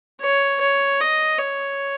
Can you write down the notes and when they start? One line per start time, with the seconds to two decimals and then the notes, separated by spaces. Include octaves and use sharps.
0.21 C#5
0.61 C#5
1.00 D#5
1.39 C#5